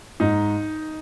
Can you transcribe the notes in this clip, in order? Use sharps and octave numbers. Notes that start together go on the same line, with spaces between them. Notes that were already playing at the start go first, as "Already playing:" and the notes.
G#2 D#4